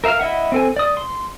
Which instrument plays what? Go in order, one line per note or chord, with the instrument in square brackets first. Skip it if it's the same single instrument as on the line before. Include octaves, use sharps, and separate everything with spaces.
[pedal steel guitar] A#4 E5 F5 A#5 F6
E4 D#5 E5 F#5
C4 A4 G#5
D5 D#6
C6